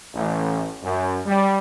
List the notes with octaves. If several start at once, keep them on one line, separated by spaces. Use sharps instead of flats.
A1
F#2
G3